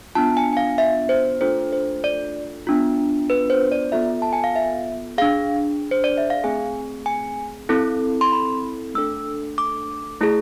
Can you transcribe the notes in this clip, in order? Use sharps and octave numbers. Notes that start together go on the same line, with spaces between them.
B3 D4 F4 A5
G#5
G#5
F5
E5
C5
A3 D4 F4 A4 C5
C5
D5
B3 D4 F4
B4
C5
D5
B3 F4 A4 E5
A5
G#5
F5
E5
D4 G#4 F5
C5
D5
E5
F5
A3 C4 G#4 G#5
G#5
C4 E4 A4
C6
B5
A3 D4 A4 E6
D6
A3 E4 G#4